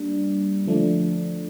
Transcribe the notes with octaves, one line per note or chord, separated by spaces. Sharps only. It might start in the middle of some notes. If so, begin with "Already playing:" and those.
Already playing: G3 A#3 D4
D3 F3 A3 D4